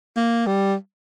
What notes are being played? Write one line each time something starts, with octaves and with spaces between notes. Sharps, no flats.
A#3
G3